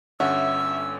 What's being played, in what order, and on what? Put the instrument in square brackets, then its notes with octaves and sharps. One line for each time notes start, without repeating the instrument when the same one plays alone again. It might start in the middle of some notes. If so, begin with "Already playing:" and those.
[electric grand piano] G1 D3 C#4 [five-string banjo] F#4 [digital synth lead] E5 [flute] E6